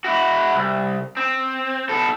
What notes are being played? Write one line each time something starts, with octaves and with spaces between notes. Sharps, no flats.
E4 F#4
C2
C4
B2 A4